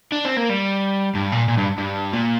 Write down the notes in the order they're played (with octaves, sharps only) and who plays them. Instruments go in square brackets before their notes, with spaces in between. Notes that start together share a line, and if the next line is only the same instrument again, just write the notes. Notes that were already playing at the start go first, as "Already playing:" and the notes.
[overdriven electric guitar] D4
C4
A#3
G3
G2
A#2
A#2
G2
G2
A#2